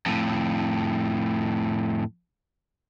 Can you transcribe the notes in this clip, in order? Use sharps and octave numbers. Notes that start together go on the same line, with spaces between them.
F2 A2